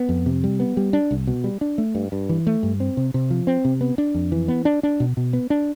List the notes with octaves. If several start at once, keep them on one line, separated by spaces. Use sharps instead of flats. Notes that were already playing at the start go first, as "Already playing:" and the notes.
Already playing: B3
F2
C3
G3
B3
G3
D4
C2
B2
G3
D4
A3
G2
G2
E3
A3
G2
C4
C3
C3
F3
C4
C3
B3
D4
F2
E3
B3
D4
D4
B2
B2
B3
D4